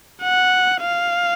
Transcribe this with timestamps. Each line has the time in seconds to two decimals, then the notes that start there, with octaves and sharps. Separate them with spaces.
0.22 F#5
0.81 F5